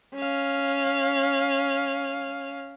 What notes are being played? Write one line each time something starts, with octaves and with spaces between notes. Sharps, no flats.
C#4 F5